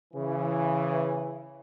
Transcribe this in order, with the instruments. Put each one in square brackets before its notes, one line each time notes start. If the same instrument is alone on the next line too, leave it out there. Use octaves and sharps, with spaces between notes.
[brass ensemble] C#3 E3